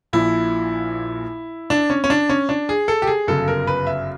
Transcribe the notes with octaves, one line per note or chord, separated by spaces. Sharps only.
A#1 A#2 F3 E4
D4
C#4
C#4
D4
C#4
D4
G#4
A4
G4
G#4
G1 F#2 C#3 A4
A#4
B4
E5